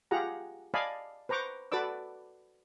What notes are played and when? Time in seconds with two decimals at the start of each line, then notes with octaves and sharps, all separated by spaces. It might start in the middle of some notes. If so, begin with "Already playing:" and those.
0.11 F4 G4 G#4 F#5 A#5
0.74 D5 D#5 F5 G#5 A5 B5
1.29 B4 C5 A#5 C#6 D6
1.72 F#4 A4 B4 D5 D6 E6